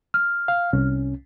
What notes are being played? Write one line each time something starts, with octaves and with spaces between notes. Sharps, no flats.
F6
F5
C2 C#4